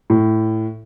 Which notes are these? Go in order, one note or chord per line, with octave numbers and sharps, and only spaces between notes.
A2